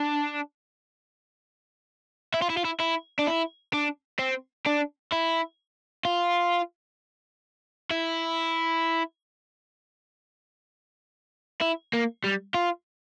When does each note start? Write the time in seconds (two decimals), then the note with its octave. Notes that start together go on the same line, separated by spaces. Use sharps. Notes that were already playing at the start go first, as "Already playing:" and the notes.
Already playing: D4
2.34 E4
2.42 F4
2.49 E4
2.57 F4
2.65 E4
2.80 E4
3.19 D4
3.27 E4
3.73 D4
4.19 C4
4.66 D4
5.12 E4
6.05 F4
7.91 E4
11.61 E4
11.93 A#3
12.24 G3
12.54 F4